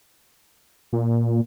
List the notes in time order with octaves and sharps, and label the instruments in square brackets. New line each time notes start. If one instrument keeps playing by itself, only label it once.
[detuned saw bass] A#2